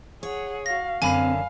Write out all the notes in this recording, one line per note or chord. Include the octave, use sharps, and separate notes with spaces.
G#4 C#5 F#5
F#4 F5 A#6
F#2 D3 C4 F5 G#5 A5 B5 D#7